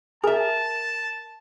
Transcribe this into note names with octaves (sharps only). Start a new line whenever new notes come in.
G#4 A#4 E5 A5